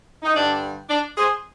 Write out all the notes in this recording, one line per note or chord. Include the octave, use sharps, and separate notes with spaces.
D#4
G2 D3 G3 D4
D4
G#4 C5